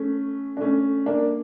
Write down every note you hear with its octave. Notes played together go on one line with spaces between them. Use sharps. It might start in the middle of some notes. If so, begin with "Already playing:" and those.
Already playing: A3 C#4
D4
A3 C#4
A#3 D4